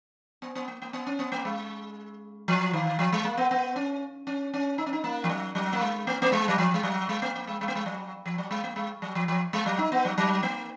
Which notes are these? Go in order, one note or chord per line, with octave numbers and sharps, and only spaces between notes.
B3
B3
A#3
A#3
B3
C#4
B3
A#3
G#3
F3
D#3
F3
G#3
A#3
B3
B3
C#4
C#4
C#4
D#4
C#4
D#4
A#3
F3
F#3
F#3
A#3
G#3
A#3
A#3
G#3
F#3
F3
G#3
F#3
G#3
A#3
A#3
G#3
G#3
A#3
G#3
F#3
F3
F#3
G#3
A#3
G#3
F#3
F3
F3
G#3
F#3
D#4
B3
F#3
F#3
A#3